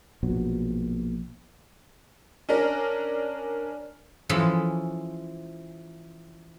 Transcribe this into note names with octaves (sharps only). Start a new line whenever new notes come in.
A#1 B2 F#3
C#4 D4 A#4
E3 F3 G#3 C#4 A4 B5